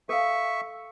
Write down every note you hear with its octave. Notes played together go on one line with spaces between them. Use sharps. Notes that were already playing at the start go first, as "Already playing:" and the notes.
A4 E5 F5 C#6